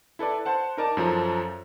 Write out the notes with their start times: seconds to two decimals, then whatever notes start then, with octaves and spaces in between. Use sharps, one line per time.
0.19 E4 A4 B4 D5
0.45 C5 F#5 A5
0.77 D#4 A#4 D5 A5 A#5 D6
0.97 F#2 F3 A4 A#5